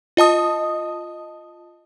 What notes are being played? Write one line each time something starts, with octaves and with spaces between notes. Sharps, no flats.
F4 D#5 A5 D#6